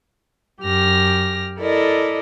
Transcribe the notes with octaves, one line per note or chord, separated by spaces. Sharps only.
F#2 G4 F6 A#6
E4 A4 A#4 D5 D#5